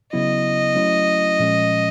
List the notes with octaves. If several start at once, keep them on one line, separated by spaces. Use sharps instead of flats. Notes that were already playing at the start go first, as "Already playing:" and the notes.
C#3 F#3 B3 E4 D#5
F#3 A3 C#4 E4
A#2 F3 G#3 C#4